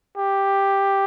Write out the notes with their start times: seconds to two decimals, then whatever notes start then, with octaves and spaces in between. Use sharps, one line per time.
0.17 G4